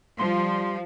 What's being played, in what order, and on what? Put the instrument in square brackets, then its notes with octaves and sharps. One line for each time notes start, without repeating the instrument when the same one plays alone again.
[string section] F3 [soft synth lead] G3 [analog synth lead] C6